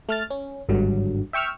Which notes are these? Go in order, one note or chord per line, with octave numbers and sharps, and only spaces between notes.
A3 F6 A6
C#4
G#1 G2 D3 F#3
E5 G5 C#6 E6 F6